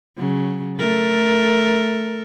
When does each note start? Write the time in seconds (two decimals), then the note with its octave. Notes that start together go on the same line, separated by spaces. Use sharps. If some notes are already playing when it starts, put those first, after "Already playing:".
0.18 C#3 F#3
0.79 A3 A4 A#4